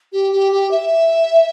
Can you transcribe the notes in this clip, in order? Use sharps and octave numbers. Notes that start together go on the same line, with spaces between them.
G4
G4
G4
E5